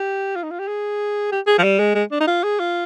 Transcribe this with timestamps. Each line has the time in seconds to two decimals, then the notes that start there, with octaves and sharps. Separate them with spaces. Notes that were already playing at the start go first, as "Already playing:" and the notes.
Already playing: G4
0.36 F4
0.43 D#4
0.51 F4
0.59 G4
0.68 G#4
1.32 G4
1.47 G#4
1.59 F3
1.63 G3
1.79 G#3
1.95 G#3
2.12 D4
2.20 D#4
2.27 F4
2.44 G#4
2.59 F4